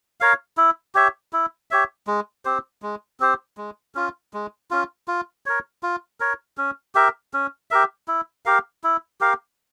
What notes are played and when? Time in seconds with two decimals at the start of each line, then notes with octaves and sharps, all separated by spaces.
0.21 A#4 C#5 F5
0.57 E4
0.95 G4 C#5 E5
1.33 E4
1.71 G4 C#5 E5
2.07 G#3
2.45 C4 G4 C5
2.82 G#3
3.20 C4 G4 C5
3.57 G#3
3.95 C#4 F4
4.33 G#3
4.71 C#4 F4
5.08 F4
5.46 A#4 C#5
5.83 F4
6.20 A#4 C#5
6.58 C#4
6.95 G4 A#4 E5
7.34 C#4
7.71 G4 A#4 E5
8.08 E4
8.46 G4 A#4 F5
8.84 E4
9.21 G4 A#4 F5